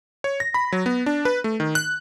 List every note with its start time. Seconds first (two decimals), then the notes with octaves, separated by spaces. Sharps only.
0.24 C#5
0.40 A#6
0.54 B5
0.72 F#3
0.86 B3
1.06 D4
1.25 B4
1.44 A3
1.60 D#3
1.75 F#6